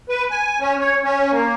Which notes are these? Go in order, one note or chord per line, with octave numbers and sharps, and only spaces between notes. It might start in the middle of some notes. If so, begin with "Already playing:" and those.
B4
G#5
C#4
C#5
C#4
A#3